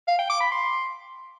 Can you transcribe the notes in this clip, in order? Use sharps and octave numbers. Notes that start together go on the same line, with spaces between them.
F5
G5
D6
B5
C6